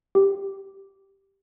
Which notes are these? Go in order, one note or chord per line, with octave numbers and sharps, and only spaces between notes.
G4